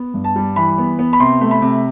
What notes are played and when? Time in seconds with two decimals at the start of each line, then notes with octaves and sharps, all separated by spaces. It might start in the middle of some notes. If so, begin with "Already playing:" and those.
Already playing: B3
0.14 G2
0.24 A5
0.36 G3
0.56 E3 B5
0.78 B3
0.99 B3
1.13 B5
1.20 C3 C6
1.41 A3
1.51 B5
1.62 C3